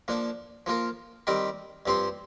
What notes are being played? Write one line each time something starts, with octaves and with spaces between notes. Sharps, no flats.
F3 A#3 D4
F3 A#3 F4 A#4
D#3 G3 C4 G4 A#4
G2 F3 C4 G4 C5